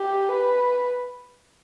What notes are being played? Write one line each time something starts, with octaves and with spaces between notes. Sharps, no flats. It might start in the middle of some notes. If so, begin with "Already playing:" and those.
Already playing: G4
B4